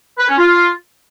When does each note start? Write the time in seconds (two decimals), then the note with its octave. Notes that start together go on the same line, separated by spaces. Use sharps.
0.18 B4
0.28 C#4
0.38 F4